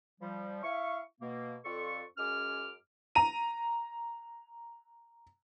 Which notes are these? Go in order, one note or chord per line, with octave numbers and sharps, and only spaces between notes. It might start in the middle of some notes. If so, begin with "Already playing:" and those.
F3 G3
E4 F5 C#6
B2 A#3
F2 F4 A4 D5 C#6
F#2 G#3 C#4 D6 F6
A#5 D#7